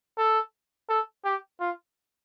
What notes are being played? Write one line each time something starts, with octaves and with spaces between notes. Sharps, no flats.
A4
A4
G4
F4